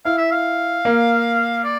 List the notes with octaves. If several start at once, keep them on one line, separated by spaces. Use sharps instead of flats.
E4 F5
E5
F5
A#3
D5